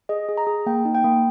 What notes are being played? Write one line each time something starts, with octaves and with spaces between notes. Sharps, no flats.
G#4 D#5
G#4
A#5
G#4
A#3 G5
D#4
G5
A#3